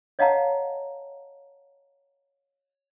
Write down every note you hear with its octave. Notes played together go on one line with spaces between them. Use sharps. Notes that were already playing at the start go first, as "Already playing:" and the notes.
C#5 D#5 F5 F#5 A5 A#5